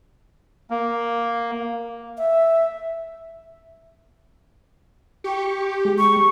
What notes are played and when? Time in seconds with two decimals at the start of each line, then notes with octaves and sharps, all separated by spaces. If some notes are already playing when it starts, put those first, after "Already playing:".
0.70 A#3
2.18 E5
5.24 G4 C#6
5.85 G#3
5.98 C#6